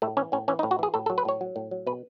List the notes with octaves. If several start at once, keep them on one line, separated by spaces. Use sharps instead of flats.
A2 A3
E3 C#4
A2 C#4
E3 C#4
D#4
A2
F#4
E3 G#4
A2 A4
A4
F#3
B4
A2 C#5
F#3
A2
F#3
B2 B4